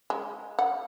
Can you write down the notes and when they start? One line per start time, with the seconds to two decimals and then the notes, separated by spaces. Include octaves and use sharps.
0.10 G#3
0.59 F#5